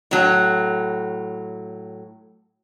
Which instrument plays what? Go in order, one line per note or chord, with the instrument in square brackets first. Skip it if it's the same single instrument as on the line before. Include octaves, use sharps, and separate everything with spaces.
[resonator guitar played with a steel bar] A2 F#3